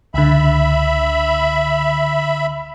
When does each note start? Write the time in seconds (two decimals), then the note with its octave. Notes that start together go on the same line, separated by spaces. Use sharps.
0.14 C#2 D3 E5 B5